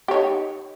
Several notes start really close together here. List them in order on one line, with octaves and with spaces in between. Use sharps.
G4 C#5 D#4